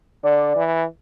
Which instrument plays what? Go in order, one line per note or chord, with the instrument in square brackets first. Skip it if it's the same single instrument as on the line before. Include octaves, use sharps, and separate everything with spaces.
[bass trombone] D3 [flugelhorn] D5
[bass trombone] E3